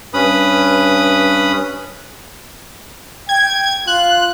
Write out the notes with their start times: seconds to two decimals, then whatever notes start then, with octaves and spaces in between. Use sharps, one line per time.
0.14 G2 C#4 B4 B5 D#6
3.29 G5 G#6
3.87 F4 F#6